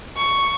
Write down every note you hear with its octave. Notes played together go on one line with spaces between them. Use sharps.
C#6